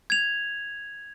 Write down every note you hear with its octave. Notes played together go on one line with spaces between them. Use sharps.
G#6 F7